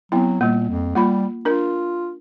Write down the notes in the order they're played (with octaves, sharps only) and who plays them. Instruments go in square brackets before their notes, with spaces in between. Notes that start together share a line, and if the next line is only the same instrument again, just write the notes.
[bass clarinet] F#3 [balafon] B3 C4 E4
[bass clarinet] A#2 [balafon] G3 A#3
[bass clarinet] F2
[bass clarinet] G3 [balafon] A#3 F4 B5
[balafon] D4 A#4 [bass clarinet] F4